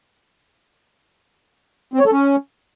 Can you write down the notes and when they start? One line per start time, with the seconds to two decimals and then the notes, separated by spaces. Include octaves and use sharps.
1.94 C4
2.00 C#5
2.06 A4
2.12 C#4